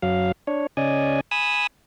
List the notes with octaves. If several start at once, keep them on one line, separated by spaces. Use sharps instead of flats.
F#2 F#3 F5
D4 C#5
C#3 C#4 D5 D#5 G#5
G#5 B5 D#6 E6